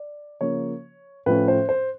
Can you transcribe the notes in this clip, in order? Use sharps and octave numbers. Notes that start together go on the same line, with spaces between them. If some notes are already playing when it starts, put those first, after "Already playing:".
Already playing: D5
C#3 F3 A#3 C#5
A2 F3 A3 C#4 B4
C5
C5